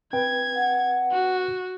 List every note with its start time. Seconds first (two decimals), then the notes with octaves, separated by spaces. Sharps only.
0.13 C4 B4 G5 G#6
0.55 F#5
1.11 F#4